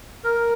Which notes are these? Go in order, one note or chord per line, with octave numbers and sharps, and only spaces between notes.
A#4